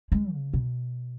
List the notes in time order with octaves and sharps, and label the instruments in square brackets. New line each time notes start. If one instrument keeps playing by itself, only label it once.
[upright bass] G#3
C#3
B2